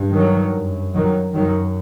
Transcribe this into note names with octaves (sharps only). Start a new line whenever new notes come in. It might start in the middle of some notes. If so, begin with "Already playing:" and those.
Already playing: G2
D#3 F#3
F#2
D#3 F#3
F#2 D#3 F#3